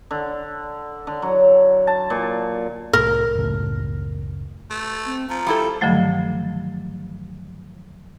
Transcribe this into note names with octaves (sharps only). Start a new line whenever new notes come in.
D3
D3
F#3
A5
A#2
C2 A2 A#4
F#1 C#2 A2
A3
C4
F3 A#5
G3 E4 A4
G2 D3 D#3 F3 F#3 A3